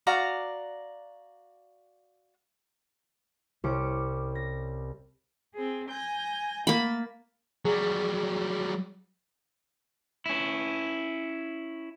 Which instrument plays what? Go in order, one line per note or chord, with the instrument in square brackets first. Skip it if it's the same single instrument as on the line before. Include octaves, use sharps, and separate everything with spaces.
[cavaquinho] F#4 D5 F5 A#5
[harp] C2 C#4 D6 C#7
A#6
[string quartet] C4 G#4
G#5 G6 A#6
[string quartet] A3 A6 [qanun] A#3 B5
[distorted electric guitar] F#3 G3 [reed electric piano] G#4
[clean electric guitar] C#4 E4